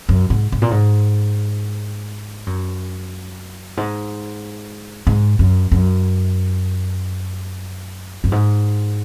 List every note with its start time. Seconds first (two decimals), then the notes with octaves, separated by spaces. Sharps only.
0.09 F#2
0.30 G#2
0.52 G#2
0.62 A#2
0.71 G#2
2.47 F#2
3.77 G#2
5.07 G#2
5.39 F#2
5.72 F#2
8.24 F#2
8.32 G#2